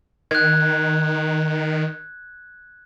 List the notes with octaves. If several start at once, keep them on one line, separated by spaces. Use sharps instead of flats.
D#3 F#6 G#6